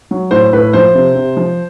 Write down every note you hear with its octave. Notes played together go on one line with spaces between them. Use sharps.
F#3
A2 C5
A2 B4
F3 C5
C3
C3
F3